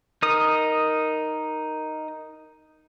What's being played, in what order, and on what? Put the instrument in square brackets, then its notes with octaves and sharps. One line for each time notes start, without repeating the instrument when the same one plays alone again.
[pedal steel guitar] D#4 A#4 D#6